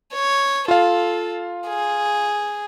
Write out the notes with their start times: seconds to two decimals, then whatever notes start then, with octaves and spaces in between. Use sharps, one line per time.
0.14 C#5
0.68 F4 A4 F5
1.68 G#4